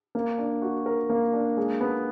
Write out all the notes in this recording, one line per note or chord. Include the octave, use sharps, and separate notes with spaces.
A#3
D4
F#4
A#4
A#3
D4
G#3
B3